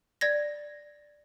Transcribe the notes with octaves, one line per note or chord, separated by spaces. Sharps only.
D5 G#6 A#6